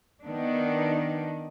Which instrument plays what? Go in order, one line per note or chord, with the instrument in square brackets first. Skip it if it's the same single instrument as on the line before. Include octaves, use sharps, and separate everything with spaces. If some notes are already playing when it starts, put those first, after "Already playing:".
[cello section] D#3 B3 D4